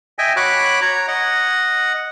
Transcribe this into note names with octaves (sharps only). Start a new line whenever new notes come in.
D#5 E5 G5 G#5
F#4 C#5 B5 D6 F#6
C#5 A#5
D#5 F#5